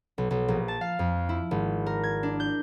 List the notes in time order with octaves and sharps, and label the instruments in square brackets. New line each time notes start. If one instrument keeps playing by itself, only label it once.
[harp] B1
B1
A#1
A5
F5
F2
E4
G#1
A#4
G#6
D4
G6